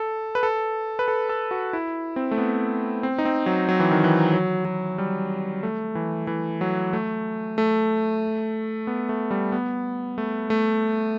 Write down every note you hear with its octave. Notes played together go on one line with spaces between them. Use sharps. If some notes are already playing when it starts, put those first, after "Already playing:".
Already playing: A4
B4
A4
B4
A4
A4
F#4
E4
C4
A3
B3
C4
D#4
C4
F#3
F#3
E3
D#3
E3
F#3
F#3
G3
A3
E3
E3
F#3
A3
A3
B3
A3
G3
B3
A3
A3